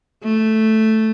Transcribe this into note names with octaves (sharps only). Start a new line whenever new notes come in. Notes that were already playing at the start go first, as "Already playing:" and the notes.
A3